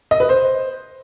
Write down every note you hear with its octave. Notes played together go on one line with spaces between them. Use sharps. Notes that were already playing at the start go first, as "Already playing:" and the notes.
D#5
B4
C5